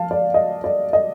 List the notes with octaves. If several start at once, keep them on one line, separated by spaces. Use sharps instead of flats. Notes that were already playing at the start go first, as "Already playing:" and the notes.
Already playing: F3 F5 A5
D5
D#5
D5
D#5